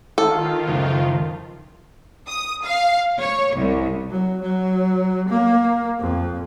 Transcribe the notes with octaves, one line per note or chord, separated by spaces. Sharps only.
D#3 F4 A4
F#1 C#2 F3
D#6
F5
C#5
C2
F#3
F#3
A#3
F2